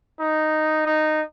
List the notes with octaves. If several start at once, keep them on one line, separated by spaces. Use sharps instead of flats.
D#4
D#4